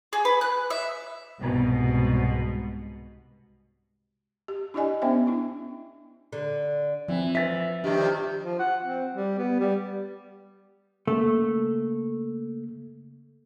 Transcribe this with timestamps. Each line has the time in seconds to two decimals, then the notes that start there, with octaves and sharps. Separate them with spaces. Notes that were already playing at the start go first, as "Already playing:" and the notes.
0.13 G#4
0.25 B4
0.41 F#6
0.70 E5
1.39 C2 G#2 B2
4.48 G4
4.74 D4 E4 G4 D5 D#5 G#5
5.02 B3 C#4 D4 C5 E5 G5
5.27 D4 E4
6.32 D3
7.08 E3 F3 C4
7.35 B4 E5 A6 B6
7.84 G2 C3 D#3 D4 G4
8.44 F3
8.60 F#5
8.84 C4
9.15 G3
9.38 B3
9.60 G3
11.07 C#3 A3 A#3